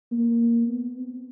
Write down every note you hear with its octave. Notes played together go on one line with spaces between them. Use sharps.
A#3
B3
C4